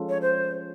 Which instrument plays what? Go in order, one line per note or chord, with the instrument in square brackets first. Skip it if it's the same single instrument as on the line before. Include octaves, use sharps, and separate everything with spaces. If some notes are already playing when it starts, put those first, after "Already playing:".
Already playing: [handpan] F3 G#3 C#4 F4 A4
[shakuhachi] C#5
C5